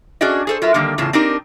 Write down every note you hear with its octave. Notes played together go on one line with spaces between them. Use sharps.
C#4 D4 F#4 G#4 D5 D#5
G#4 A4 C5
F#3 F4 A#4 E5
D3 D#3 G3 A#3
E2 A2 C#3 F4 A5
C4 D4 D#4 G4 A#4